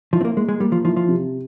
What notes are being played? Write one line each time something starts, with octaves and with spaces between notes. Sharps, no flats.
F3 E4
C4
A#3
G#3 A#3
G#3
G3 A#3
F3
F3 E4
F3
C3